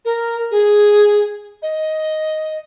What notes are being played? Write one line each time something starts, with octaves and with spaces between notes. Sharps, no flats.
A#4
G#4
D#5